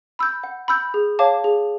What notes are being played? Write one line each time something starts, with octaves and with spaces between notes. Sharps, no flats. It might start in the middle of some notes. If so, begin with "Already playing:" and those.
B5 E6 G6
F#5
B5 E6 G6
G#4
C#5 F5 A5 D6
G#4